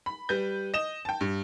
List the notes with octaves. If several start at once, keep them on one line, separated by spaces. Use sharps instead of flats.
B5
G3 B4 G6
D#5 E7
G5 A5
G2